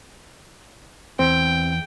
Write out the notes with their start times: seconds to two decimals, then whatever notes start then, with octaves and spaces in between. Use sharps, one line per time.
1.19 E2 C4 G5